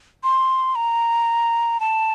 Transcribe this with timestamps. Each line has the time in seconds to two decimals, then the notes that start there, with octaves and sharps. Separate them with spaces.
0.24 C6
0.75 A#5
1.80 A5